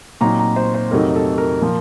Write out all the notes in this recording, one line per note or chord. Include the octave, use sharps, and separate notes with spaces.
A#2 F#3 C4 D#4 A#5
A#5
C5
C5
F2 C3 F#3 A3 D#4 A#4
A4
A#4
A#2 F3